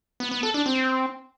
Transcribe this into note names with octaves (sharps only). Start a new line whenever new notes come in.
B3
B3
A4
D4
C4